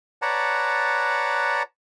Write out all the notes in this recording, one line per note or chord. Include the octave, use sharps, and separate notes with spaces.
B4 C#5 D5 F#5 A5 A#5